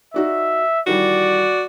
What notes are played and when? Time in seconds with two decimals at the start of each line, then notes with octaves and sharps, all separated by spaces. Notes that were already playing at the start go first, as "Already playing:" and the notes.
0.14 D#4 F#4 D5 E5
0.87 D#3 E3 G3 F#4 D5